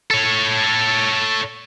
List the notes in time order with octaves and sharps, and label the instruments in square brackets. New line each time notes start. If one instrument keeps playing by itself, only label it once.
[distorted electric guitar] A4 C#5